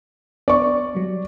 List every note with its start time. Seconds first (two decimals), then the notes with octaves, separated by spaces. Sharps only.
0.48 B3 D5 C#6
0.95 F#3 G3